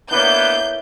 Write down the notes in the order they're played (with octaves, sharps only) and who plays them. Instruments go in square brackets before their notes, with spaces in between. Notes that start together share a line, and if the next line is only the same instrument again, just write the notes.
[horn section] A#3 B3 D4 [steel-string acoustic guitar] E4 C#5 [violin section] G6